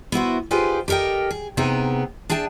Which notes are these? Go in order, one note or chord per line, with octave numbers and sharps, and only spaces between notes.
B3 E4 F#4 C5
D#4 F4 G4 G#4 B4 C5
G4 A4 A#4 D#5 G5
G#4
C3 B3 D#4 G#4 G5
D4 G#4 E5 G5 A5